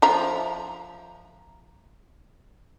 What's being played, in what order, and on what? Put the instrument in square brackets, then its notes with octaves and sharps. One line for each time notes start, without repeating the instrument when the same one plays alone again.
[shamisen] F3 E5 A#5